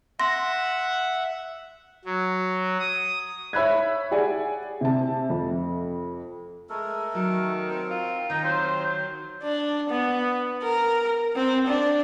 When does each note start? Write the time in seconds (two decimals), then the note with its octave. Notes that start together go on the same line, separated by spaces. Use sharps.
0.20 E5 F#5 C6 A#6
2.05 F#3
2.80 D#6
3.53 C#5 E5 B5 F#6 G#6
4.11 G4 G#4 D5 F#5 G#5
4.81 C3 A5
5.30 F2
6.69 G#3 A3 A4 A#4
7.14 D#3 F#3
7.70 C4 A#4
7.91 F4
8.30 D#3 D#4 G5 A#5
8.43 F#3 C4 F4 C5
9.43 D4
9.90 B3
10.63 A#4
11.36 C4
11.68 D4